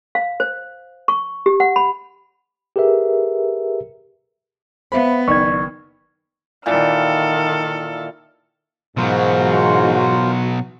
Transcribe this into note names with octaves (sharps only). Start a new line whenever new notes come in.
F5
C5
C#6
G4
F#5
B5
G4 G#4 A#4 B4 E5
B3 C5 E5 F5 B5
F#1 D#3 D5 C#6 G#6
A#2 D#3 E3 A4 F6
G#2 B2 E3 F#3 F4 F#4 A#4 C5